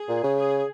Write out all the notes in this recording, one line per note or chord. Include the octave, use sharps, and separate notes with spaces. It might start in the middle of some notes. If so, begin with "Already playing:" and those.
Already playing: G#4
A#2
C#3
G#4